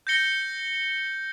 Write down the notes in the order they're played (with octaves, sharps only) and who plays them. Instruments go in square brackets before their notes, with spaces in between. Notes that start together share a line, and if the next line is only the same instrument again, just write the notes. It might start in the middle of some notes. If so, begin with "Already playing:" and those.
[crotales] G6 A#6 C#7 G7